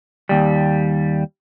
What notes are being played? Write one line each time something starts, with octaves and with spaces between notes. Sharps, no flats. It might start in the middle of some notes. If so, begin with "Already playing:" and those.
D#2 G3